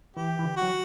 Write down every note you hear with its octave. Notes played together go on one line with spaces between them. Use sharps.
E3 G4
E3
D3
F#4
F#3